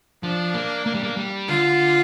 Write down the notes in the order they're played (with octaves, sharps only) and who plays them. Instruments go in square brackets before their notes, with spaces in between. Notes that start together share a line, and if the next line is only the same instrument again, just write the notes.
[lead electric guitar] F3 [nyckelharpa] D4
[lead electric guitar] A#3
A#3
G3
A#3
G3
[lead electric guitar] D3 [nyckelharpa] F4